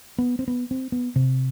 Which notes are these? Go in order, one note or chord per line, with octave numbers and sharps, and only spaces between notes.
B3
C4
B3
C4
B3
C3